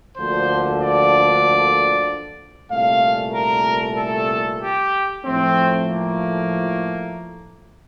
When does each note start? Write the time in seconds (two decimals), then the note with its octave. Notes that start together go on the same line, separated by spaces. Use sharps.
0.17 D2 D3 F3 A#3 C5
0.81 D5
2.70 C2 A#2 A3 F5
3.33 A#4
3.97 A4
4.61 G4
5.24 A2 F3 A3 C4
5.87 A#3